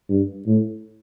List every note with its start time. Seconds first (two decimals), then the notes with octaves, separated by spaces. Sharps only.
0.10 G2
0.47 A2